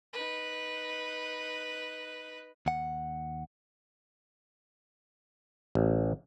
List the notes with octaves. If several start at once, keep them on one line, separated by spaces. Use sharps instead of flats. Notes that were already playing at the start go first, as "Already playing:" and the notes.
D#4 B4
D#2 F#5
A1